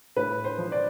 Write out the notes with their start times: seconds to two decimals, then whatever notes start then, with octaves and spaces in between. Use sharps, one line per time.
0.16 A2 B4
0.44 C5
0.58 F3
0.72 D5